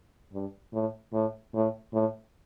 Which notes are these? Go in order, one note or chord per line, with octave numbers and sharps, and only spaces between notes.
G2
A2
A2
A2
A2